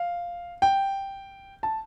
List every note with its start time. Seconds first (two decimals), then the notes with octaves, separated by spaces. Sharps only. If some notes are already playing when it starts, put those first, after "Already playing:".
Already playing: F5
0.62 G5
1.63 A5